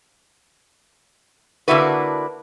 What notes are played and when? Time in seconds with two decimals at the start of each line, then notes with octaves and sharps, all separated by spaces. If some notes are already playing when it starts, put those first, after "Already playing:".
1.68 D3 A#3 D4 E4 F#4 B4